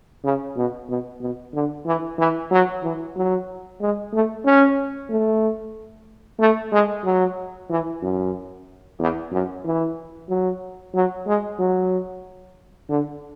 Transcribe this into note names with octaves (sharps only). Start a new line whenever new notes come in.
C#3
B2
B2
B2
D3
E3
E3
F#3
E3
F#3
G#3
A3
C#4
A3
A3
G#3
F#3
E3
F#2
E2
F#2
E3
F#3
F#3
G#3
F#3
D3